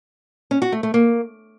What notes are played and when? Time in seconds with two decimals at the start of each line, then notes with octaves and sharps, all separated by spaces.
0.51 C#4
0.62 F#4
0.72 A3
0.83 A3
0.94 A#3